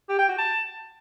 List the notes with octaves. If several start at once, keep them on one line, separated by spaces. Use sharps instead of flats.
G4
G5
F#4
A5